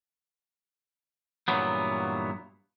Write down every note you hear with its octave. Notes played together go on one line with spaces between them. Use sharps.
G2 A#2 E3 F#3 B3